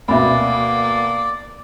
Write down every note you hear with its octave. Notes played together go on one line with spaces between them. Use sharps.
D2 B2 A#3 D5 E5 B5